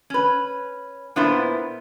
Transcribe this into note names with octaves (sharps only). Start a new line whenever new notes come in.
C#4 B4
A#2 B3 D4 E4 A#4 C5